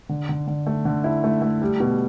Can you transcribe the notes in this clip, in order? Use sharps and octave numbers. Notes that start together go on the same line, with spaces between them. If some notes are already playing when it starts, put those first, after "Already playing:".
D3
D3
D3
A3
D3
E4
A3
A3
G3
B2